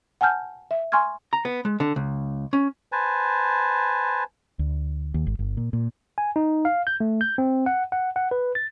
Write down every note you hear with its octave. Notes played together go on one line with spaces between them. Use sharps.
F#5 G#5 A5 F6 G6
E5
G#5 C6 C#6 F6 G#6
A#5
B3
G#3
D3
C#2
C#4
B4 C5 G#5 A5
D2
D#2
G#1
G1
A#2
A#2
G#5
D#4
F5
G6
A3
G6
C4
F#5
F#5
F#5
B4
A6